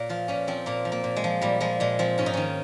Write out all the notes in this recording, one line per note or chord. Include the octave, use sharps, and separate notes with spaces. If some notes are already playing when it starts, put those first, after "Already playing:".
Already playing: A#2 A#4 C#5 F5
F3 F4
A#2 C#4
F3 C4
A#2 A#3
F3
A#3
A#2
G#3
F3
A#2 G3
F3 G#3
A#2 G#3
F3 C4
G#2 C#4
D#4
D#3 C#4